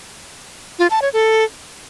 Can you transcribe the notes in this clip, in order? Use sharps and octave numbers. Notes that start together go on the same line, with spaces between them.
F4
A5
C#5
A4